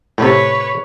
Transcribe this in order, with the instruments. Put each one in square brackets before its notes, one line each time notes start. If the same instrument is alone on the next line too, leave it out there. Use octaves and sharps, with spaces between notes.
[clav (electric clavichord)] A2 C3 [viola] B4 C#5